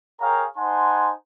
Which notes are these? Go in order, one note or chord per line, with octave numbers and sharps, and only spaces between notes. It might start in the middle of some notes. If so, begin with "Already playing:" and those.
G#4 A#4 C#5 F5 G5 A#5
D#4 C5 F#5 G#5 A5 C6